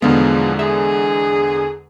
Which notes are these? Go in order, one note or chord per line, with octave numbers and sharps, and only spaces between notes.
B1 E2 D3 F3 G#3 B3 G#4 F5
G#4 E5